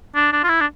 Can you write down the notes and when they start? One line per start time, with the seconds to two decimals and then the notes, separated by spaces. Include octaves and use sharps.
0.15 D4
0.33 D4
0.44 F4
0.49 E4
0.61 D4